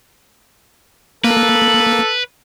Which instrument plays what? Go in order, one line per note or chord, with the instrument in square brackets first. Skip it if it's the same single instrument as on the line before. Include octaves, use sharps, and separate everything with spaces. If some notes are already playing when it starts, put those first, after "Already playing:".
[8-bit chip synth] A#3 [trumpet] A4 [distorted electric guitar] B4